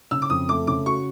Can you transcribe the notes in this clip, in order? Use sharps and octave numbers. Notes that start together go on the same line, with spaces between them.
C#3 E6
D6
F2 D#6
A3 D6
C#3 D6
F#4 C#6